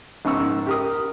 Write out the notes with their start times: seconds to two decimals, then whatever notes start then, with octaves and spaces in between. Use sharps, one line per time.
0.25 A#1 G#2 C#3 C#6 E6
0.66 G4 A#4 D#6